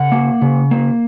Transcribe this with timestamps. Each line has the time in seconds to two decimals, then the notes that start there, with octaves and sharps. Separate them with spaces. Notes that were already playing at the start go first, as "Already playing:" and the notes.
Already playing: C#3 F#5
0.12 A#3
0.42 C#3
0.71 A#3